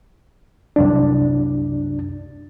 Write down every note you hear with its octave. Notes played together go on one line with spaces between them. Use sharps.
C2 F#2 D4